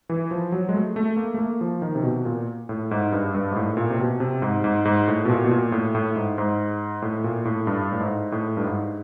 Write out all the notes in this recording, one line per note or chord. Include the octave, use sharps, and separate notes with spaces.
E3
F3
F#3
G#3
A3
A3
A#3
A3
A#3
F3
D#3
C3
B2
A#2
A2
G#2
G2
G2
G#2
A2
A#2
C3
B2
C3
G#2
G#2
G#2
A2
B2
A#2
B2
A#2
A2
A2
G#2
G#2
A2
A#2
A2
G2
A2
G#2
A2
G2
G#2